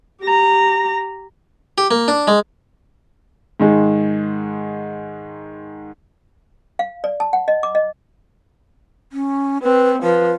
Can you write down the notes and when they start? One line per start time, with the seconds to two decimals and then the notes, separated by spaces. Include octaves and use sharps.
0.22 G4 A#5
1.78 G4
1.91 A#3
2.08 D4
2.27 G#3
3.60 G#2 D#3 G#3
6.79 F5
7.04 D5
7.20 A5
7.33 F#5
7.48 D#5
7.63 D6
7.75 D#5
9.12 C#4
9.62 C4 B4
10.03 F3 B4